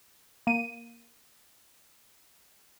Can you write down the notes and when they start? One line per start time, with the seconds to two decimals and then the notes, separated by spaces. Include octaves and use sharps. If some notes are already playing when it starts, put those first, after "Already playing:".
0.47 A#3 D#7